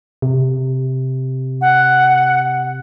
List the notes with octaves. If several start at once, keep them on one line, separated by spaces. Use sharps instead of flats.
C3
F#5